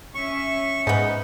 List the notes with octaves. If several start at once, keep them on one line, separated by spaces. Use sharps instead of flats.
C#4 E5 C#6
G#2 B3 D#4